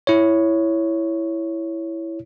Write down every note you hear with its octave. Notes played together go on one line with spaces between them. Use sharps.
E4 C#5